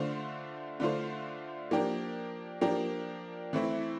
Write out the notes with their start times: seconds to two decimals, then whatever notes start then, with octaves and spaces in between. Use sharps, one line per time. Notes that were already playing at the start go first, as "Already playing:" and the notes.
Already playing: D3 A3 D4 F4 C5
0.80 D3 A3 D4 F4 C5
1.71 F3 A#3 D4 G4 A#4
2.61 F3 A#3 D4 G4 A#4
3.53 E3 A3 C4 E4